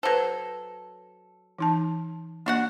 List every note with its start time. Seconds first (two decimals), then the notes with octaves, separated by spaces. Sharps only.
0.03 F#3 A4 B4 C5
1.59 E3 D#4 A5
2.46 A#3 D4 F#4 F#5